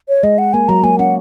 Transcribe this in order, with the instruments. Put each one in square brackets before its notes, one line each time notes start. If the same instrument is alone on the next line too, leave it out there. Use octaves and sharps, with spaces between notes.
[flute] C#5
[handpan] G#3 [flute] D#5
[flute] F#5
[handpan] A#3 [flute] G#5
[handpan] F#3 [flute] A#5
[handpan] A#3 [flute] G#5
[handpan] C#4 [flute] F#5